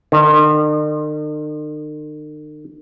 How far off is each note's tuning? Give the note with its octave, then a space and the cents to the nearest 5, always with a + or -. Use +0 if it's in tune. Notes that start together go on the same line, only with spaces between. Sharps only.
D#3 -45